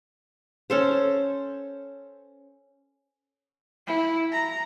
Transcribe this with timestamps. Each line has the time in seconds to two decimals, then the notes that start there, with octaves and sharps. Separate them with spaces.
0.70 C#4 A4 C5
3.87 E4
4.32 A#5